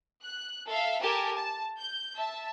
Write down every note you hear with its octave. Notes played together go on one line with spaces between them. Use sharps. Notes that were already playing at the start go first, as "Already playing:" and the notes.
F#6
A4 E5 F5
G4 A4 A#4 G#5 A5
A5
G6
E5 A5